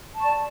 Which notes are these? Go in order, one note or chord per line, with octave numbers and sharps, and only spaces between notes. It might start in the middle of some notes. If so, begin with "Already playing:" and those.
D5 A5 C#6